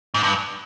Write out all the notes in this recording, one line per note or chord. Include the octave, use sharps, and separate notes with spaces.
G#2
G2